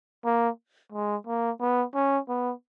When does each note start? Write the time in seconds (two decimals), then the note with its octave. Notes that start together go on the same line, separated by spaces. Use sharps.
0.25 A#3
0.92 G#3
1.27 A#3
1.60 B3
1.95 C#4
2.29 B3